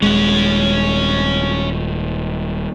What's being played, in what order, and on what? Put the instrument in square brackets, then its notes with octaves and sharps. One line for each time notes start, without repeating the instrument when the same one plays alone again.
[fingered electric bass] D#1 G#3 [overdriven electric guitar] C#4 F#5